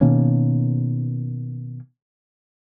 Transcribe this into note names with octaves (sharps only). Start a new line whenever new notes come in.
B2 D#3 A#3 C#4